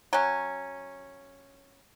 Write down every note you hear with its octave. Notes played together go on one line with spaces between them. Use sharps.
F#3 C#4